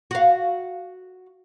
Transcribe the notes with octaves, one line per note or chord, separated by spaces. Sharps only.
F#4 F5